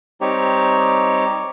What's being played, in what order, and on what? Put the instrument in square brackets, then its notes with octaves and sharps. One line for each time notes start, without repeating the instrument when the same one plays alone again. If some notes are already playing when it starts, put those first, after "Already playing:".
[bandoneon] G3 C4 D#4 G4 C#5